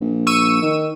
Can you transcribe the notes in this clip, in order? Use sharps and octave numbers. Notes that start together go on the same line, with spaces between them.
A#1
C#6 E6 D#7
D#3